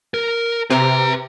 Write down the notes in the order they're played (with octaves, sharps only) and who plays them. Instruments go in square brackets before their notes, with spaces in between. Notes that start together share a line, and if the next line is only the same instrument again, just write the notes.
[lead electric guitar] A#4
[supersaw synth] C3 [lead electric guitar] B4 A#5